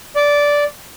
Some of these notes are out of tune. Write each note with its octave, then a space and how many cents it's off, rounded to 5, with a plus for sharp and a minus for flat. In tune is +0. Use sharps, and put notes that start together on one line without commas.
D5 -10